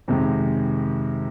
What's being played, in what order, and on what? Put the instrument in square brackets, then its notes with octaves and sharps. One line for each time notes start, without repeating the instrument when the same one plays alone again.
[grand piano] F2 C3 D#3 G#3